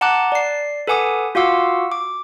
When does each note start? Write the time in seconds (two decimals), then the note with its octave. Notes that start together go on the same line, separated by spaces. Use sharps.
0.01 F#5 A5 A#5 D6 F#6
0.32 D5 C7
0.87 A4 B4 F#5 G#5 D6 D#6
1.35 F4 F#4 F5 F#5 D6 E6
1.92 D6